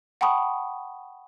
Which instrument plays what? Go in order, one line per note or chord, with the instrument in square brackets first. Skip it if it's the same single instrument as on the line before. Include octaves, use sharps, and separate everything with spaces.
[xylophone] F#5 G5 A5 B5 C#6 D#6